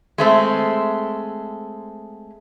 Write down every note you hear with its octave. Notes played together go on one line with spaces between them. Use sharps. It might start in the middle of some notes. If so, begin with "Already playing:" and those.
G#3 A3 C4